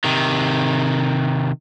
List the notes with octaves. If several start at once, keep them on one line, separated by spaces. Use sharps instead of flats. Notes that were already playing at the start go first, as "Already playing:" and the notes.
C3 D#3